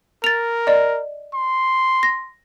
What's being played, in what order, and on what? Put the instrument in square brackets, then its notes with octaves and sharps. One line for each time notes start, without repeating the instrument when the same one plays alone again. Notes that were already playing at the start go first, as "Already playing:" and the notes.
[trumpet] A#4 [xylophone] A6 F7
[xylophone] D5 D#5
[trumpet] C6
[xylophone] A#6